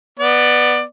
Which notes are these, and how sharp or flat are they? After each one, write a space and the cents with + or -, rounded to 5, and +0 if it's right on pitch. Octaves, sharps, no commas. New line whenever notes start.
B3 +0 D5 +15